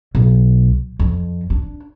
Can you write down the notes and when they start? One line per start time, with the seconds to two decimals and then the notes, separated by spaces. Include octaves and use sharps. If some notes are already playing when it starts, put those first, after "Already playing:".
0.15 B1
0.99 F2
1.50 D4